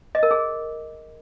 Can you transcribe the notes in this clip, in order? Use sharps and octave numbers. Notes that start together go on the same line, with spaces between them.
D#5
A#4
G#4